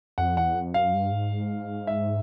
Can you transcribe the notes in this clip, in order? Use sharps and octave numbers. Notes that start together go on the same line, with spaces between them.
F2 F#5
E2 F#5
F2
F#2 F5
G2
G#2
E5